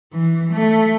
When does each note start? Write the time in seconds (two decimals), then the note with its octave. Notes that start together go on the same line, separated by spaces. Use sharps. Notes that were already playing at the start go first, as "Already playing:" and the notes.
0.13 E3
0.53 A3